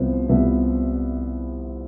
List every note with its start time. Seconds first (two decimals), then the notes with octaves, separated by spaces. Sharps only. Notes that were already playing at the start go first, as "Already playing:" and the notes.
Already playing: C2 C3 F3 B3 C5
0.29 C2 C3 F3 B3 E5